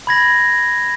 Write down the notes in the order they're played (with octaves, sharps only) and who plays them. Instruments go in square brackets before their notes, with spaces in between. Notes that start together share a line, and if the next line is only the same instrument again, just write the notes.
[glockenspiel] B5 G#6 A#6 F#7